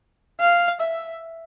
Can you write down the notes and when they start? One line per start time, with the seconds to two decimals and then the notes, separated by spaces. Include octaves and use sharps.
0.40 F5
0.80 E5